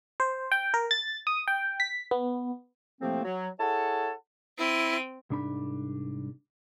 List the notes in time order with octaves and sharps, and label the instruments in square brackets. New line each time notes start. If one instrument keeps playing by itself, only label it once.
[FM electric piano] C5
G5
A#4
A6
D#6
G5
B6
B3
[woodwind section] A2 C3 F3 A3 A#3 C4
F#3
E4 G#4 A4 C#5 F#5 A5
[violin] C4 D#7 [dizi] E4
[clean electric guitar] C2 G#2 D4 D#4 B5